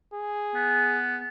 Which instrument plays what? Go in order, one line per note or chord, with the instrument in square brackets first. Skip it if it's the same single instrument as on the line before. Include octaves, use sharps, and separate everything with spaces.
[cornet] G#4
[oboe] B3